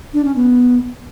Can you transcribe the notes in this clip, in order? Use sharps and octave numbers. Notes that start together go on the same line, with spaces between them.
D4
C#4
B3